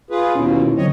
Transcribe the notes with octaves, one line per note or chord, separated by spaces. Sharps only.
F4 G#4 B4
D#2 B2 C#4 E4 F4
D3 F#3 C4 C#5 D#5